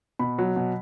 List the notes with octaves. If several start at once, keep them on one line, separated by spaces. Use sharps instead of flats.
B2 B5
F#3
B2